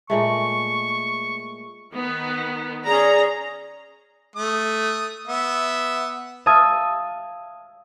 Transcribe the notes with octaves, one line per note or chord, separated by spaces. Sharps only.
A#2 G#3 A3 C#6
D#3 B3
C#4 G#4 D5 A#5
A3 D#6
B3 E5
E5 F5 A5 D#6 E6 G#6